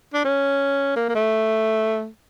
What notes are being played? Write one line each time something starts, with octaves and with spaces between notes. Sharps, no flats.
D4
C#4
A#3
A#3
A3